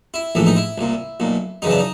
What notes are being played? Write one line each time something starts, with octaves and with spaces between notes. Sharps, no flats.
E4
A#1 A2 E3
D#4
E4
C2 A#2
B1 A#2
F#2 C#3 E3 D#4
D4
D#4